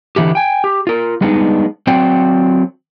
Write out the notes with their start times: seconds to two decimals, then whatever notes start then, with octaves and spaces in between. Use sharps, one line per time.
0.16 D3 E3 E4 G4
0.35 G5 G#5
0.64 G4
0.87 F4 A#4
1.21 G3 G#3 B3 D4 D#4
1.87 F#3 C4 C5 D5 F#5 G5